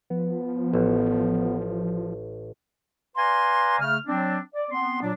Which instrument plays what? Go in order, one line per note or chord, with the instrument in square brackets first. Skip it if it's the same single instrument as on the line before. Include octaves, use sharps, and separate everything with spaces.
[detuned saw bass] F3 [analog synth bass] B3
[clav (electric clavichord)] A1
[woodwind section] B4 D5 F5 G#5 A#5 C6
C#3 A3 F6
F#3 C4 D4
D5
B3 C4 C6
A#2 F#3 D4